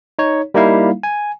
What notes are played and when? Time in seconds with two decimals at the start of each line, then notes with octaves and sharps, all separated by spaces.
0.19 D#4 C#5
0.54 G3 A#3 D#4 E4 F5
1.03 G#5